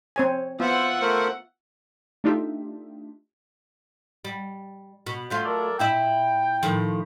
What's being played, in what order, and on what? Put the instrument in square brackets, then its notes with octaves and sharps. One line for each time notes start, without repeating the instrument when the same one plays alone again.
[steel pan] C4 C#5 G#5
[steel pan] B3 [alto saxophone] F4 [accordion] C5 [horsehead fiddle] E5 F#5
[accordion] A3 A#4 C5
[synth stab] A3 D4 D#4 F4 G4 E5
[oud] G3
B2
[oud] F#3 A3 F4 [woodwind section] C5
[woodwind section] A4 A#4 D5
[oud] A#2 E4 E5 [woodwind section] G5
[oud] A2 D#3 F3